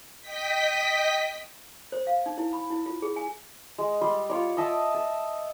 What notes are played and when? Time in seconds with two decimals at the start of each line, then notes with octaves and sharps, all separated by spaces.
0.20 D#5 G5 B6
1.92 C5
2.07 F5
2.26 D#4
2.38 E4
2.53 B5
2.70 E4
2.86 F4
3.02 G#4
3.16 G#5
3.79 G#3
4.01 G3 C6
4.30 F4 C#5 D5
4.57 D#5 E5 A5 D6
4.94 A5